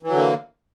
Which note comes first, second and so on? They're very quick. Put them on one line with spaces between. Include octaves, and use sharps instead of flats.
E3 F#3 D3 A#3